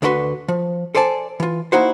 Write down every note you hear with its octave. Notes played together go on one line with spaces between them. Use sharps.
D2 D3 E4 F#4 B4 C6
F3
A4 C5 D5 G#5 A5
E3 F4
A#3 D#4 E4 F#4 C5